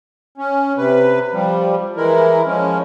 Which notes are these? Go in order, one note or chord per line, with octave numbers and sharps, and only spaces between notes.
C#4
C3 B4
F3 G3
E3 G#3 E4 A#4
F3 G#3 C#4